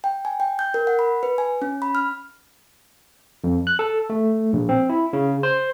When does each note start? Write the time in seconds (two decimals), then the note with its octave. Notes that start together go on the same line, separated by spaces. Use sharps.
0.04 G5
0.25 G#5
0.40 G5
0.59 G6
0.74 A#4
0.87 F#5
0.99 B5
1.23 B4
1.38 G#5
1.62 C#4
1.82 B5
1.95 F6
3.44 F2
3.67 F#6
3.79 A4
4.10 A3
4.53 A#1
4.69 C4
4.89 E4
5.13 C#3
5.43 C5